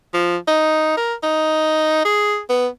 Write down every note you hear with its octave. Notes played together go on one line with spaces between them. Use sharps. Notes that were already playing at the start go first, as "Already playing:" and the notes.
F3
D#4
A#4
D#4
G#4
B3